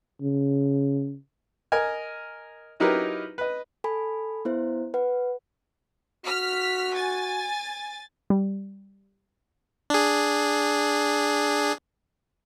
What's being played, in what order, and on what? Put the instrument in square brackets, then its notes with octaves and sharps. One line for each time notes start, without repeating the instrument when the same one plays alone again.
[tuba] C#3
[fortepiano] A#4 D#5 G#5
F#3 D#4 E4 G4 A#4 B4
B4 D#5
[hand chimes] A4 G#5 B5
B3 E4 C5
B4 F#5
[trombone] F#4 [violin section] F6 B6
[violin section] G#5 A6
[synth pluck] G3
[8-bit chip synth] D4 G#4